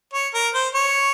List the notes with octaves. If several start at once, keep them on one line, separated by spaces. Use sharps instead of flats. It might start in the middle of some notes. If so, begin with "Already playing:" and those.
C#5
A#4
C5
C#5